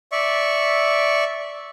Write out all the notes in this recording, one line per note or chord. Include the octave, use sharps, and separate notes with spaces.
D5 E5 C#6